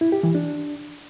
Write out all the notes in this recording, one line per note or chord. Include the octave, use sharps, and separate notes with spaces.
E4
G4
E3
D4